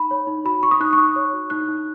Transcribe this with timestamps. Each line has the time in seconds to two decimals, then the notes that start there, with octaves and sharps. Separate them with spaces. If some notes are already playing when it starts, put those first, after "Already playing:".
Already playing: D#4 B5
0.11 C#5
0.27 D#4
0.45 F#4 B5
0.63 F#4 C#6
0.71 D#6
0.80 D#4 F#6
0.93 C#6
0.98 D#4 D#6
1.16 C#5
1.33 F#4
1.50 D#4 F#6
1.68 D#4